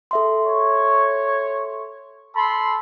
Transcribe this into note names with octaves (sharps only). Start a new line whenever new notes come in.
A4 E5 C6
C#5
A4 B5 C6